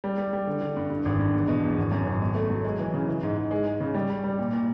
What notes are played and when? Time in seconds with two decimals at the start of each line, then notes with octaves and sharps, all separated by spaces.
0.04 G3
0.18 G3
0.33 G3
0.47 D3
0.61 D3
0.77 G2
0.90 G2
1.05 G#1
1.19 G2
1.34 E2
1.48 B2
1.64 E2
1.78 G#1
1.92 F#2
2.06 G#1
2.21 B2
2.35 A3
2.50 F#3
2.65 G#3
2.79 E3
2.94 C#3
3.08 E3
3.23 G#2
3.37 G#2
3.51 G#3
3.66 G#3
3.80 C#3
3.95 G3
4.10 G3
4.24 G3
4.39 A#2
4.53 A#2